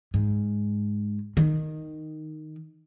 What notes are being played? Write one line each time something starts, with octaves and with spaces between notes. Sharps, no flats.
G#2
D#3